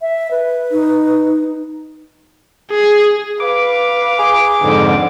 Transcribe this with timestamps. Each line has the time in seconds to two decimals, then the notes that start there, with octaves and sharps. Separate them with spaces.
0.01 E5
0.31 B4
0.71 D#4
2.71 G#4
3.40 B4 F5 D6
4.19 G#4
4.62 F2 G#2 D3